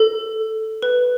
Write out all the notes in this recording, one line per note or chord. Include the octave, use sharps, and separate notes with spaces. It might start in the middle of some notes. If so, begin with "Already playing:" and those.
Already playing: A4
B4